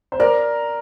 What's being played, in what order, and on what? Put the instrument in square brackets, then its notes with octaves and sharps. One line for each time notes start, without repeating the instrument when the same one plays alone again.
[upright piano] C5
[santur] A#4 [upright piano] D5